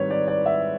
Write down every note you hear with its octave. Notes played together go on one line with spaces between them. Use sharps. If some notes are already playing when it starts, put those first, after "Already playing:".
Already playing: G#2 D#3 G3 C4 B4 C#5
D5
D5
E5